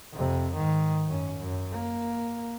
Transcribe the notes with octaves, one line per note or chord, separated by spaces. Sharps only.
F2 C3
G#2 D#3
F#2 C#4
F#2
A#3